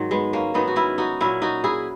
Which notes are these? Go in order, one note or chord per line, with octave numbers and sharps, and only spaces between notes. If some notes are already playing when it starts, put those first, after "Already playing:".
Already playing: G#2 D#3 F#3
G#3 B3
A#3 C#4
G#2 D#3 F#3 B3 D#4
F#4
C#4 E4
D#4 F#4
A#2 F#3 C#4 E4
D#4 F#4
E4 G#4